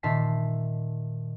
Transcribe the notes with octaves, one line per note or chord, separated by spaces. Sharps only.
A#2 D#3 E5 A5 C6 B6